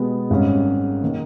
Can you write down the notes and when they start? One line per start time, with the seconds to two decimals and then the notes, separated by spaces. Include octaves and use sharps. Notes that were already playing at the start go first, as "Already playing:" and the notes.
Already playing: B2 G#3 B3 G4
0.30 G#1 G#2 D#3 G3 C#4
1.03 D#3 A#3